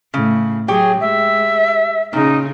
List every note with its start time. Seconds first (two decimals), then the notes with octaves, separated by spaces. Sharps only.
0.14 A2 C#3
0.68 F#3 G4 G#4 C#5 G5
1.00 G#3 E5
2.13 A#2 C#3 D#4